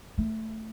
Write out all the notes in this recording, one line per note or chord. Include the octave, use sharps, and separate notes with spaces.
A3